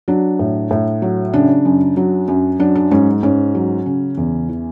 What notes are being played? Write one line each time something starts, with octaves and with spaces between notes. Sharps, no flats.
F#3 D4
A2
A2
F#3
C#3 D4
F#2
F#3
F#2
F#3 D4
D4
G#2 C#4
G#2 C#4
F#3
C#3
E2
E3